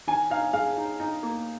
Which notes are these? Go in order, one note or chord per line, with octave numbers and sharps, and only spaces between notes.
D#3 G#5
D#4 F5
G#3 F5
D#4
D#4
A#3